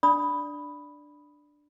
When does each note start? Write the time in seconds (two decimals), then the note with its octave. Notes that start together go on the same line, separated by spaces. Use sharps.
0.03 D4 D5 B5 D#6